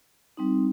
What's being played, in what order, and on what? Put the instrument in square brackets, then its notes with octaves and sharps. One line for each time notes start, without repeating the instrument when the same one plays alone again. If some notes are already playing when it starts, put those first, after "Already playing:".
[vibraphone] G3 C4 D#4